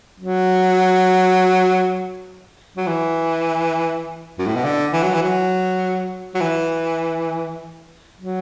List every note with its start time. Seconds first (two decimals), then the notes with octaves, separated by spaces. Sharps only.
0.20 F#3
2.77 F#3
2.87 E3
4.39 F#2
4.47 A2
4.55 B2
4.64 D3
4.93 E3
5.03 F#3
5.13 E3
5.23 F#3
6.35 F#3
6.41 E3
8.18 F#3